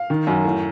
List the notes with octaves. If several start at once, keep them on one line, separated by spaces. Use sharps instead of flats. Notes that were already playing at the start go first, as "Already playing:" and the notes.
Already playing: F5
D#3
F#2
A2